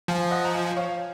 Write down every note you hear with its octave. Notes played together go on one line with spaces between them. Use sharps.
F3 F5 G#5
D#5 F#5
A#5
F5 G#5
C#5 F5